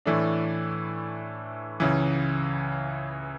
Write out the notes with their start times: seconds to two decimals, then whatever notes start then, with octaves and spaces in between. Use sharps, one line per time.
0.06 A2 E3 A3 D4
1.80 C#2 C#3 E3